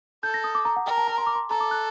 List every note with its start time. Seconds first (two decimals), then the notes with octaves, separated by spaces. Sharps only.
0.23 A4 G6
0.34 A#6
0.44 D#6
0.55 D6
0.65 A#5
0.76 F#5
0.86 A#4 G5
0.97 A5
1.07 A#5
1.18 C6
1.26 D6
1.35 C6
1.50 A4 A#5
1.60 D6
1.71 F#6